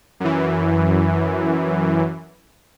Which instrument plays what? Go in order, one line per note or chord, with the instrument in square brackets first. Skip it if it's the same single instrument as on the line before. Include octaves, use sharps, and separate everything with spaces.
[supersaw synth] F#2 E3